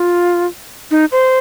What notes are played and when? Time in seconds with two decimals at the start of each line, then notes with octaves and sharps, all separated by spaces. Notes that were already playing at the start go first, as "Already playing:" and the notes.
Already playing: F4
0.91 D#4
1.12 C5